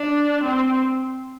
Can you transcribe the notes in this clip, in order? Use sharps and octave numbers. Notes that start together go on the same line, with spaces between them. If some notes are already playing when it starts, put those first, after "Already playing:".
Already playing: D4
C4